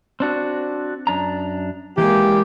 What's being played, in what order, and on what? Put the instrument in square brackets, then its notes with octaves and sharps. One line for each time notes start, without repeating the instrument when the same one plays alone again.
[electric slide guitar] C4 D4 F#4
F#2 D4 A#5
[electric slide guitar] E3 G#3 [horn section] A#3 G4